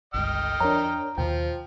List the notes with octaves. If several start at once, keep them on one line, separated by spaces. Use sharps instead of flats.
G1 C#2 G2 D#5 G5 F6
F2 D4 A#4 C#5 A#5
D#2 B2 D#3 F3 G5